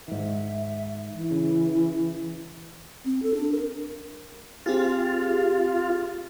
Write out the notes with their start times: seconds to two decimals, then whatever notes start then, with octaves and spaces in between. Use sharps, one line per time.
0.08 G#2 D#3 E5
1.13 E3
1.31 C#3
3.05 C4
3.22 A4
3.34 D4
3.52 A#4
4.66 C4 F4 G4 G#4